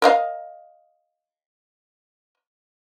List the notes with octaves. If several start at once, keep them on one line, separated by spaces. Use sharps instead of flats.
A#4 D#5 F5